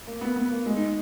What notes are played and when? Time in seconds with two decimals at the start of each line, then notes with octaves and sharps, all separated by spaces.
0.07 A#3
0.21 B3
0.36 B3
0.51 A#3
0.66 G#3
0.76 D#4